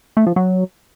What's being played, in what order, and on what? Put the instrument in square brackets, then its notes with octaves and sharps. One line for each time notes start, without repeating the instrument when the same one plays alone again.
[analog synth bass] A3
F3
F#3